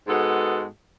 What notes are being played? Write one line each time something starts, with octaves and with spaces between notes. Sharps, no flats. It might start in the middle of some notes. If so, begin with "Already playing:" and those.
G#2 G#3 B3 F#4 A4